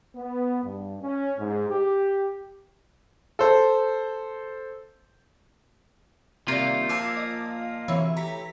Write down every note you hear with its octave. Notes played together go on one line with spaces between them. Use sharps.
B3
G2
C#4
G#2
G4
A4 C5
C3 D#3 G3 A#3 F4 D5 G6
F3 G#5 A5 D6 E6
D#5
D2 C3 E3 C#5
A3 G4 A#5 B6